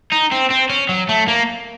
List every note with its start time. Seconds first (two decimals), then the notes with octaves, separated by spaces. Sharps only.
0.12 D#4
0.32 C4
0.51 C4
0.70 C#4
0.89 F#3
1.09 A3
1.28 A#3